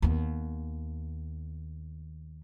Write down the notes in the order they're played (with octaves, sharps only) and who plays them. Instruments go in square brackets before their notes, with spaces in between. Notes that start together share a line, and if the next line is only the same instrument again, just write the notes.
[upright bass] D#2 B3